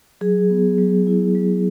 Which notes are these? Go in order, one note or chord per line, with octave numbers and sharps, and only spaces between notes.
F#3 G#4
B3
F#3
E4
F#3